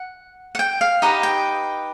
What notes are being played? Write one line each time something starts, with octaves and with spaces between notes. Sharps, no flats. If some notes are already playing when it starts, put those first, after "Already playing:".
Already playing: F#5
F#5
G5
F5
D#4 G4 B4 D#5 F#5
G5